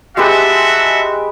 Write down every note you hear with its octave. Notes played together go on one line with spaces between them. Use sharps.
G#3 F#4 G4 A4 B4 E5